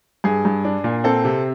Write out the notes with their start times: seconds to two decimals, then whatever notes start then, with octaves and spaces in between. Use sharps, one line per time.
0.24 G2 G#4
0.45 G2
0.65 D4
0.84 A#2
1.04 C4 A4
1.25 C3